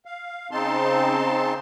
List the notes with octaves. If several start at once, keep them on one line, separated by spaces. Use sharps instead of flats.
F5
C#3 C4 D#4 A5 C6